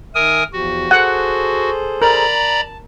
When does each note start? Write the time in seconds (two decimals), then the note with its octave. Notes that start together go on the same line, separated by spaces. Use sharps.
0.15 D#3 A#4 E5 G#5 D#6
0.53 E2 F3 F#4 G4
0.91 G#4 A4 C5 F#5
2.02 A#4 D5 A#5 B5
2.43 A5